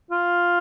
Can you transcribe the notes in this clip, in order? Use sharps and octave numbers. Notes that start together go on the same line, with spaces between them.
F4